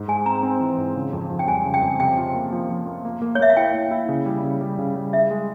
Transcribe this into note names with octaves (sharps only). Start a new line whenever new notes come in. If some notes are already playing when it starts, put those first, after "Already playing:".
Already playing: G#2
G#3 G#5
C4 A#5
C4
E3
G#2
C#3
F2
F2
G5
G3 G#5
C#3
G5
F2
C3 G5
F4
A#3
F3
F3
A#3
A#3
A#3
C#5
A#3 E5
F5
E4 G5
A#3
E4
C#3
G3
C#3
G3
C#3
G3
G#4 E5
G#3